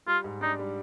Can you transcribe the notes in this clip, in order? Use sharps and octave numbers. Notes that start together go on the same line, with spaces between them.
G3 F4
G#2
D4 D#4
G3